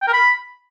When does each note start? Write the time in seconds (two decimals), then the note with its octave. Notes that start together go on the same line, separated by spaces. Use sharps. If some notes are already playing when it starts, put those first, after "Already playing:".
0.02 G5
0.08 A#4
0.13 B5